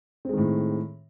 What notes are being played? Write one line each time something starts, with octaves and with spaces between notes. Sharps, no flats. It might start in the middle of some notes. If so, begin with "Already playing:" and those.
A2 D#3 G#3 C4